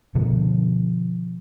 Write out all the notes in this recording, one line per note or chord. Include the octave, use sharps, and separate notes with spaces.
B2 D3 F3